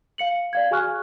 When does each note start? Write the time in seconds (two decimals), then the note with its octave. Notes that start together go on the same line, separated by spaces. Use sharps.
0.18 F5 C#7 F#7
0.53 D5 F5 G#6
0.71 F#4 G#4 G#5 C#6 F6 F#6